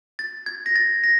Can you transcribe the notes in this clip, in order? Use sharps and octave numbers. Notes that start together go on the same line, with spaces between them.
A6
G#6
A#6
A6
A#6